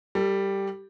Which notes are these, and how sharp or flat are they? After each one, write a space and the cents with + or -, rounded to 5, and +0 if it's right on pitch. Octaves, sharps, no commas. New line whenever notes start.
G3 +0 A4 +30